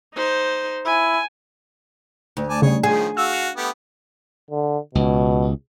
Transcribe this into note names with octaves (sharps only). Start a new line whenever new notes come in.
D#4 C5
E4 G#5
D2
D5 G#5 A5
C#3 G3 G#4 C#5
D#3 F3 C#4 G#4
F#4 F5 E6
A3 B3 G4
D3
C#2 B2